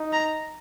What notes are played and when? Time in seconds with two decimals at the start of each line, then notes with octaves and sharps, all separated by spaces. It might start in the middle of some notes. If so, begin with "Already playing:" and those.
Already playing: D#4
0.13 A#5